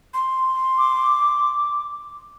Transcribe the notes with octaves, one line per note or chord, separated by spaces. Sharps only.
C6
D6